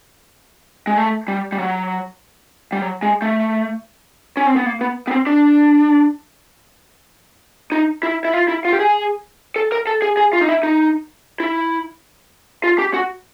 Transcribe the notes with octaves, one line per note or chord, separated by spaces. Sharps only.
G#3
A3
G3
G3
F#3
G3
F#3
G#3
A3
C#4
C4
B3
A#3
B3
B3
C4
D4
D#4
E4
E4
F4
E4
F4
G4
G#4
A4
A#4
A4
G#4
G#4
F4
D#4
E4
D#4
E4
F4
G4
F#4